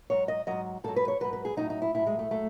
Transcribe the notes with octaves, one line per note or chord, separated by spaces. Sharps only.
G#2 F#3 C#5
D#5
G#2 F#3 D#5
G#2 F#3 A4
B4
C#5
G#2 F#3 B4
B4
G#4
A2 F#3 D#4
D#4
E4
A2 F#3 E4
G#3
A3
A2 F#3 A3